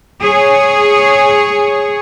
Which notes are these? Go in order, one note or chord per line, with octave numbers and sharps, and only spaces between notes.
G#4 C#5